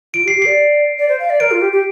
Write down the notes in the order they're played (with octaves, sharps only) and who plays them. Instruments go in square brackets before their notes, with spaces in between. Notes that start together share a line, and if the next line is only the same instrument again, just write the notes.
[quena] F4 [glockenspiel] D7
[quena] G4
[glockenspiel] C7
[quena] G4
[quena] D5 [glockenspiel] C7
[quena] D5
C5
F5
D5
[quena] A#4 [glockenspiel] D7
[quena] F4
G4
G4